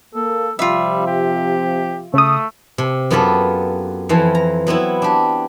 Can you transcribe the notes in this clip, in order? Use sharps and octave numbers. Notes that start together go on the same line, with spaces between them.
A#3 A4
C3 F3 G3 F4 E5
G4
C#3 A3 D#6
C3
F#2 B3 F4 G4 A4 B5
F2 E3 F3
A#5
F#3 B3 C4 E4
D4 G4